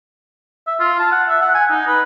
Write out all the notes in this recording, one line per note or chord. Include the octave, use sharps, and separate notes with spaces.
E5
F4
A5
F#5
E5
F#5
G#5
D#4
B4